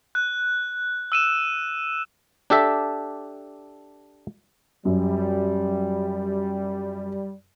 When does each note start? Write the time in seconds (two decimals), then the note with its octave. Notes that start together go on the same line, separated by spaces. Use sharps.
0.15 F#6
1.12 E6 D#7 E7
2.50 D4 G4 A4 E5
4.85 F#2 G3